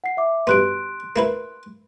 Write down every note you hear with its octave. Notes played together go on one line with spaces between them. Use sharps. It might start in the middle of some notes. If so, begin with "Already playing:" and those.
F#5 C7
E5 D6
G2 B2 B3 C6 F#6 D7
A#3 E4 B4